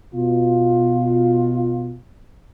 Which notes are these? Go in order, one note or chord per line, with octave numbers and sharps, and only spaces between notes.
B2 F4